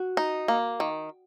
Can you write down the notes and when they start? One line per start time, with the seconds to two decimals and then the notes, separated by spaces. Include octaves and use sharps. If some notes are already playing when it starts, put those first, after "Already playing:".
Already playing: F#4
0.17 D#4
0.48 A#3
0.80 D#3